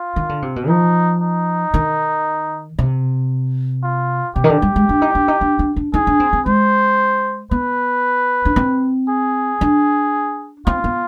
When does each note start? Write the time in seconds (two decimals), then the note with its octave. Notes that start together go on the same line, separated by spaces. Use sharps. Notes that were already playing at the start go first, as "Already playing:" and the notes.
Already playing: F4
0.16 D#3
0.29 D3
0.42 C3
0.56 B2
0.69 F3 D#4
1.22 D#4
1.74 D#3
2.79 C3
3.83 F4
4.36 C3 G4
4.44 D#3
4.50 D3
4.62 G3
4.76 G#3
4.89 D4
5.02 D#4
5.15 D4
5.28 D#4
5.41 D4
5.59 D4
5.76 D4
5.94 D#4 G#4
6.07 D4
6.20 C4
6.33 C4
6.46 G#3 C5
7.51 B3 B4
8.45 D4
8.56 C4
9.09 G#4
9.61 D4
10.66 C4 F4
10.84 B3